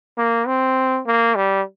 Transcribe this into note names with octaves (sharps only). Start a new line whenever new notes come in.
A#3
C4
A#3
G3